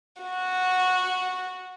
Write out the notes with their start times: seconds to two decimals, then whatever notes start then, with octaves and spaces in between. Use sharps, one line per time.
0.22 F#4